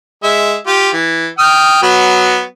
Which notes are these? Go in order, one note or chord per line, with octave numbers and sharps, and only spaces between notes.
G#3 E5
F4 G4
E3
G5 D#6 F6
F#3 B3 F#4